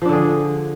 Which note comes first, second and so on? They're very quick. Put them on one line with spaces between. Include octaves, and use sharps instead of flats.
F3 D4 D3 G#4